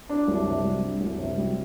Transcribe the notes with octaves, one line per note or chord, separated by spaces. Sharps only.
D4
C2
C3
G3
D4
C2
C3
G3